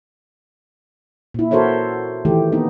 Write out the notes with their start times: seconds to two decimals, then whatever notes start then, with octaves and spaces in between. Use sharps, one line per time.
1.34 A#2 E4
1.51 F#4 A4 A#4 C5 C#5 E5
2.25 D#3 E3 A3 G4
2.52 A#3 B3 D#4